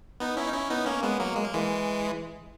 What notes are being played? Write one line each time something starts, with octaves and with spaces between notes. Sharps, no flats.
B3 D#4
C#4 E4
D#4
C#4 E4
B3 D#4
A#3 C#4
G#3 B3
F#3 A#3
G#3
A#3
E3 G#3